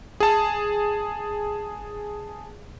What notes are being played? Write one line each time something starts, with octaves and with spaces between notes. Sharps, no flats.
G#4 A5